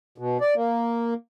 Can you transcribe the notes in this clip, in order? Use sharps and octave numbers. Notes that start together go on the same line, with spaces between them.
B2
D5
A#3